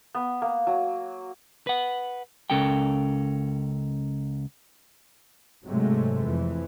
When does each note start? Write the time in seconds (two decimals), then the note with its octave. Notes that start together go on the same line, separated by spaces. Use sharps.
0.15 B3
0.42 A#3
0.67 F#3
1.67 B4 F#5
2.50 C#2 C#4 A4 A#4 G5
5.65 G#2 C3 F#3 G#3 A3
6.23 F2 E3